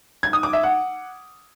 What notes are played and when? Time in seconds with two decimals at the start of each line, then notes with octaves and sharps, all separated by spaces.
0.23 G#6
0.33 D#6
0.43 D6
0.53 E5
0.63 F#5